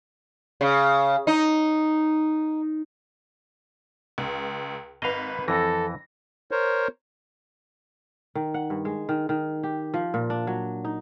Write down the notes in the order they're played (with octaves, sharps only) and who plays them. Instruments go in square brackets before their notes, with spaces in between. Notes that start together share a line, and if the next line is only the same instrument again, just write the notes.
[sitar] C#3
D#4
[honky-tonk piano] C#2
[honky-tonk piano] G#1 B4 [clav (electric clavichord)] D#5 F5
[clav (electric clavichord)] F2 E3 [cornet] A4 [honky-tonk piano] A#6
[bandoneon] A#4 C5 C#5
[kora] D#3
F#5
G2
G#3
D#3
D#3
G4
F3
A#2
D4
F#3
D#4